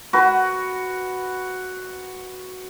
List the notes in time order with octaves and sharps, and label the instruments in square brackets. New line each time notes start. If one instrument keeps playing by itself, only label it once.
[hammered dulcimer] F#4 B4